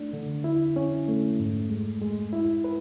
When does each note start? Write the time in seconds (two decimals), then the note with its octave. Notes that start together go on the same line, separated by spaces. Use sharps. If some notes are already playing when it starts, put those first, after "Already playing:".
Already playing: A3 D4
0.13 D3
0.44 E4
0.76 C#4
1.08 A3
1.39 G#2
1.70 G#3
2.02 G#3
2.33 E4
2.64 B4